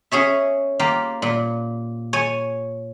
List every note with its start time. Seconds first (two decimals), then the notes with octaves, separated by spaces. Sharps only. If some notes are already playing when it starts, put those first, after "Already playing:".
0.11 C#4 G#4 C#5 E5
0.79 A#3 F4 G4
1.22 A#2
2.13 C#5 G#5